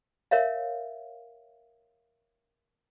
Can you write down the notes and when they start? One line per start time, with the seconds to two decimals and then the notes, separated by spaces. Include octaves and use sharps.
0.31 A#4 C#5 E5 F5